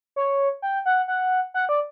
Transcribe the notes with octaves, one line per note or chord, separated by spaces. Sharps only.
C#5
G5
F#5
F#5
F#5
D5